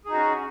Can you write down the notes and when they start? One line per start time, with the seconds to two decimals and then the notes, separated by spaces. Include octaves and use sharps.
0.05 G#4
0.09 D#4
0.12 F#4
0.16 C#4